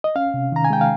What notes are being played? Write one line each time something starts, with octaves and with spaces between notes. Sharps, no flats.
D#5
C#4 F5
C3
D#3 A#5
G#5
G#3 G5
F5